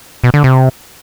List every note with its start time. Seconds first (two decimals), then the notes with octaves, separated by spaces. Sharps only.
0.24 B2
0.34 D3
0.44 C3